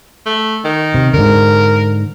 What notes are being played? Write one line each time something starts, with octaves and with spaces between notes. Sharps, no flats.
A3
D#3
C3
G#2 D3 A#4